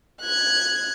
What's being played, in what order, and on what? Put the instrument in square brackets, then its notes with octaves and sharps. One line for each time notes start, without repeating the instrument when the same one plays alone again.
[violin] F#6 G#6